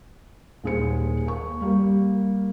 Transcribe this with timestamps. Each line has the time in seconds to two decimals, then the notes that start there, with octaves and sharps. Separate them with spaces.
0.64 D#1 D#2 G#4 C5 C#7
1.26 A#3 C#6
1.61 G3 A#3 G4